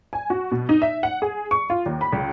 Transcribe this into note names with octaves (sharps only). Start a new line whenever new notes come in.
G#5
F#4
B2
D#4
E5
F#5
G#4
C#6
F4
D#2
B5
C#2